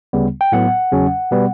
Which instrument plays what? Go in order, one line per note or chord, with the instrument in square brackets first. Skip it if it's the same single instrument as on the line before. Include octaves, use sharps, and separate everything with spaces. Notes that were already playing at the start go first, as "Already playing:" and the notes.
[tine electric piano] D2 C#3 G3 B3
G5
A2 F#3 B3 F#5
E2 C#3 F#3 C#4
B2 G3 B3